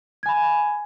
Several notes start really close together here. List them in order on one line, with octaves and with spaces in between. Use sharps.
G#6 G#5 B5